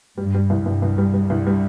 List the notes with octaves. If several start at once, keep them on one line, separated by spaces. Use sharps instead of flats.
G2 G3
G3
C2
C2 G2
C2
G3
G3
C2
G3